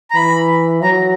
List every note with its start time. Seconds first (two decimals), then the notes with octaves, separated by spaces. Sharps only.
0.11 A#5
0.15 E3 B5
0.83 F#3 A#5